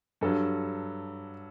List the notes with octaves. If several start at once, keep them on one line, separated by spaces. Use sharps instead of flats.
G2 F#3 A4